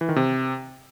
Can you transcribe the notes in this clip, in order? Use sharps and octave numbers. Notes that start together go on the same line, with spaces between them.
E3
D#3
C3